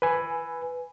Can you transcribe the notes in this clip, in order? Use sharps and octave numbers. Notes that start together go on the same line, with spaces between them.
B4 G#5